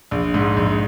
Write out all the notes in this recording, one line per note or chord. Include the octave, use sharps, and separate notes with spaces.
A#1
G#2
A#1